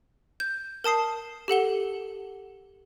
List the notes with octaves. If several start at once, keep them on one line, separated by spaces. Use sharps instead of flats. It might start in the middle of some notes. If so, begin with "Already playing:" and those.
G6
A#4 A5 D#6 C7
G4 A4 F#5 G7